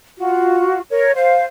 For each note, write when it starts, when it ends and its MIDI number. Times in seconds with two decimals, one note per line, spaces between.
0.17 0.80 65
0.17 0.80 66
0.89 1.14 70
0.89 1.14 73
1.14 1.44 72
1.14 1.44 77